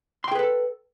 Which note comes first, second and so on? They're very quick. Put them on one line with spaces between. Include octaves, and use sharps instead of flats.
C6 G5 G#4 B4 A4